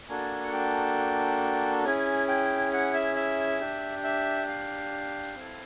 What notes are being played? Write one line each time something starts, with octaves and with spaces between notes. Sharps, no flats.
A#3 D4 F#4 A4 G#5
F#5
G5
C#4 E4 G#4 G#5
G5
F#5
E5
E5
D4 G4
E5
F5
C4 E4 A4